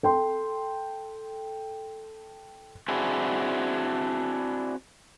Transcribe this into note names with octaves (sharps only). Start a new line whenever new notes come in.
A4 G5 C6
C4 D4 E4 F#4 G#4